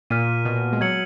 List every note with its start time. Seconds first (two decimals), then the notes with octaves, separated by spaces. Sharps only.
0.10 A#2 F6 B6 D#7
0.45 B2
0.73 G#3
0.81 F#3 G#6 C#7 F#7